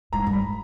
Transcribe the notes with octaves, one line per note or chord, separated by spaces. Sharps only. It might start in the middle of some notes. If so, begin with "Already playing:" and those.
G#2 A#5
G2
B5